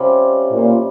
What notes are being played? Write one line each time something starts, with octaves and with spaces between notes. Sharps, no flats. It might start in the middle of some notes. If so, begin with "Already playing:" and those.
Already playing: C3 G3 C#4 F4
A#2